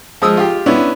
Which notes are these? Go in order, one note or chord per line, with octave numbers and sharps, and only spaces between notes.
F3 G#3 D#6 E6
F4 G4
B3 C#4 D4 E4